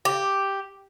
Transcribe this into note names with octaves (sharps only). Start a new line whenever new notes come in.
G4